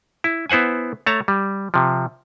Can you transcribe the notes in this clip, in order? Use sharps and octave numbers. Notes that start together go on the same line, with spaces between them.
E4
B3 E4 C5 F#5 G#5
A3 C#5 A5 A#5
G3
C3 F3